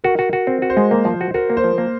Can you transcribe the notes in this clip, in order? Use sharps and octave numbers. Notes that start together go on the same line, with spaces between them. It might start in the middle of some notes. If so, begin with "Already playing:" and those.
F#4 A#4
F#4
F#4
C4
F#4
C5
G#3
A#3
F3
F#4
F#4 A#4
A#3
C5
F3
A#3